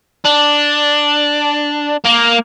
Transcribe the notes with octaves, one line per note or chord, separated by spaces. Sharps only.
D4
A#3